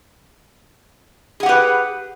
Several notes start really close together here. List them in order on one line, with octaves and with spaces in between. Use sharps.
G#4 F#5 G4 B4